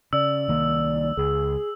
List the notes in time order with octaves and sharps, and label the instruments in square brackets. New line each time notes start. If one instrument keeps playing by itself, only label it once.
[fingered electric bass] C#3 [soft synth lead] D5 [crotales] E6
[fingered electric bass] C2 D#3 A#3
[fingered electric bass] C#2 [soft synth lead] G#4